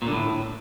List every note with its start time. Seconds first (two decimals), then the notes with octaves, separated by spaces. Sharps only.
0.02 A#2
0.07 D3
0.12 A2